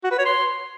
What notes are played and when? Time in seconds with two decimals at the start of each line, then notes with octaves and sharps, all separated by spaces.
0.04 F#4
0.11 B4
0.19 C#5
0.26 C6